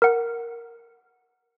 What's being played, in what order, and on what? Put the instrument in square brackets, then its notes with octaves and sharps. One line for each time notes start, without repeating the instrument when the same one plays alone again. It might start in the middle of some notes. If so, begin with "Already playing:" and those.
[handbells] A#4 F#5